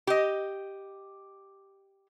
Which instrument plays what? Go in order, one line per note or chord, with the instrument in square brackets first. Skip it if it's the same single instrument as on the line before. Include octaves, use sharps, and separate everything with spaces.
[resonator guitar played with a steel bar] G4 D#5